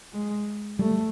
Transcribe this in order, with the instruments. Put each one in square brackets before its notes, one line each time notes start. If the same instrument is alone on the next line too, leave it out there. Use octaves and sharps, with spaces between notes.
[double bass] G#3
[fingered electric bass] G3 [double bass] A3